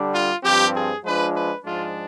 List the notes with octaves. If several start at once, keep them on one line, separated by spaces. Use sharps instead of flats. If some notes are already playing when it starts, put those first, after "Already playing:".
Already playing: D3 G3 D4
F4
G2 F3 C4 G4
G#4
F3 G#3 D4 F4 B4
B4
G#2 F3 G#3 D4 F4